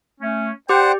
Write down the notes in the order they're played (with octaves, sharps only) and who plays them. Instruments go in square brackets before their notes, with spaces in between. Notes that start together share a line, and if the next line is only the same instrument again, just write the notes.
[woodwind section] A3 C#4
[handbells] G4 [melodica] C5 F#5 [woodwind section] D5 G5